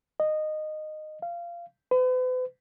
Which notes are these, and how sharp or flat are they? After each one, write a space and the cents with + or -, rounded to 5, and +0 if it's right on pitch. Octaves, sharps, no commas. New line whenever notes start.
D#5 -15
F5 -20
B4 +45